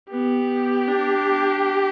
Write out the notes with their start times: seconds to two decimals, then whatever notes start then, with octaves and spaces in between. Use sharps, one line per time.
0.11 B3 G4
0.88 D4